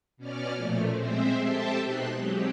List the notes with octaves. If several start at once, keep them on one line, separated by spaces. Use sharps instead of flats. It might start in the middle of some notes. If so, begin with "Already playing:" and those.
B2 C#4 D5 F6
A#2 F3 A3
G#3 C4 C5 E5
G4 A4 C5 E5 G5 A5
B2 D#4 C6 F#6
F#3 G#3 C4 G4